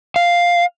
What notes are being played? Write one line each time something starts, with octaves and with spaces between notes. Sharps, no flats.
F5